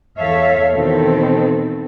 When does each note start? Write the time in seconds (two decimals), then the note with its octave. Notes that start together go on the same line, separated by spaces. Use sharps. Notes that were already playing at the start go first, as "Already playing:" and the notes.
0.19 E2 A4 C#5 E5 F5
0.74 B2 D#3 E3 C4 A4